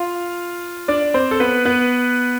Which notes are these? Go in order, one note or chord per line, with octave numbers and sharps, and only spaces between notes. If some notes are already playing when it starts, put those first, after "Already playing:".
Already playing: F4 F5
D4 D5
C4 C5
A4
B3 B4
B3 B4